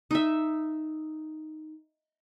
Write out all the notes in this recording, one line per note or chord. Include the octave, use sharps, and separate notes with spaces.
D#4 E5